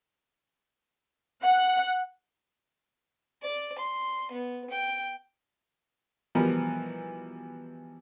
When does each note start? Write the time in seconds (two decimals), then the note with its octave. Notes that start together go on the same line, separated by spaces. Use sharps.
1.43 F#5
3.43 D5
3.78 C6
4.31 B3
4.70 G5
6.35 B2 E3 F3 G3 B3 A#4